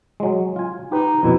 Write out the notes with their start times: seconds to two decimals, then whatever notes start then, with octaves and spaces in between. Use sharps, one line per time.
0.20 F#3 G#3
0.56 F4 G#5
0.92 D#4 G4 B4
1.23 F2 B2 E4 B4